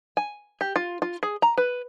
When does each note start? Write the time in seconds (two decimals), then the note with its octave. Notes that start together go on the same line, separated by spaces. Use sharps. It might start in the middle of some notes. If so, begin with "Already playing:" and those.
0.17 G#5
0.61 G4
0.76 F4
1.02 F4
1.23 G#4
1.42 A#5
1.58 B4